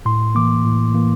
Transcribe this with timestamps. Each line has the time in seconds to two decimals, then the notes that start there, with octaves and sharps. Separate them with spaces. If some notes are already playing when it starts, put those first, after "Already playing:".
0.05 A2 C6
0.35 E3 A#3 D6
0.65 A2
0.94 E3 A#3